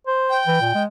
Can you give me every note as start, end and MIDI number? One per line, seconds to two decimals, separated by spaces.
0.07 0.40 72
0.30 0.82 79
0.47 0.58 52
0.61 0.72 46
0.75 0.86 56